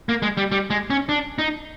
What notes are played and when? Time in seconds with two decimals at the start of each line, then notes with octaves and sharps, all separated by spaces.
0.09 A#3
0.22 G#3
0.37 G3
0.52 G3
0.70 G#3
0.90 C#4
1.09 D4
1.38 D#4